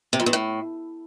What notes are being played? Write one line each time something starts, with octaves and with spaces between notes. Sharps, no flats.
C3
F2
E2
A2